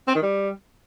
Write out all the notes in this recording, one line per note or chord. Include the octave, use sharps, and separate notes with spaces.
C4
D#3
G3